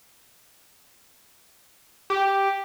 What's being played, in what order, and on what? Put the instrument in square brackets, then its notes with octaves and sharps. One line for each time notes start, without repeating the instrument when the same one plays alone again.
[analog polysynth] G4